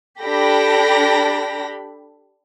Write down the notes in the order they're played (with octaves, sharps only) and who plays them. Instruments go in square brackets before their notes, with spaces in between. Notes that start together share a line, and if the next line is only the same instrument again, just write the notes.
[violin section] D4 G4 A4 B5 A#6